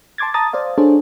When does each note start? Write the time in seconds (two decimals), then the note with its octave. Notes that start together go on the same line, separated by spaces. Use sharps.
0.18 A5 C6 D6 G#6 A6
0.34 A5 A#5 D#6 A6
0.53 C5 D5 F5
0.78 D4 G#4 A4 C5 C#5